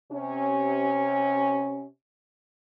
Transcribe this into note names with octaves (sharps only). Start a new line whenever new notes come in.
C3 C#4